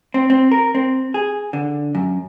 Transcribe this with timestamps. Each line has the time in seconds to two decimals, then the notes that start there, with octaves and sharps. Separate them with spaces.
0.14 C4
0.30 C4
0.52 A#4
0.75 C4
1.14 G#4
1.53 D3
1.95 F#2